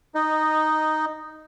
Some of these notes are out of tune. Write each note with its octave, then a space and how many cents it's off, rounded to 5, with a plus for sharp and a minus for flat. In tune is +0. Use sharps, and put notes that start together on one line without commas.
D#4 +0 D#5 -10